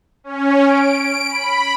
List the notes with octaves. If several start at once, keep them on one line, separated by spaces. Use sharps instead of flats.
C#4
D7
B5